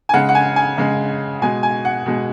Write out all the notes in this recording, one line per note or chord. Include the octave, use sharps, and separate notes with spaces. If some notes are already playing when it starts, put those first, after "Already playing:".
G#5
C#3 G#3 F#5
F#5
G#5
G#5
C#3 G#3
B2 G#3 G#5
G#5
F#5
B2 G#3